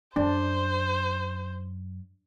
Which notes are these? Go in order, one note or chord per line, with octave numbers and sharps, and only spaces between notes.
F#2 D4 C5